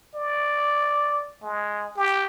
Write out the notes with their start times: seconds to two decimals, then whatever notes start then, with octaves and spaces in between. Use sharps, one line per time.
0.16 D5
1.42 G#3
1.96 G4